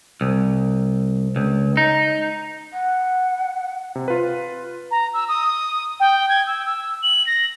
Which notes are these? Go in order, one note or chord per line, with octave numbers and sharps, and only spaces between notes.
C2
C#2
D#4
F#5
C3
F4 B4
A#5
E6
D#6
G5
G#6
E6
E6
F#7
A#6